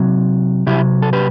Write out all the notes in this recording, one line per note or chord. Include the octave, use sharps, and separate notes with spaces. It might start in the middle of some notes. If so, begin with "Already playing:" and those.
Already playing: C3 F#3
C3 F#3 E4 G4
A4
G4 B4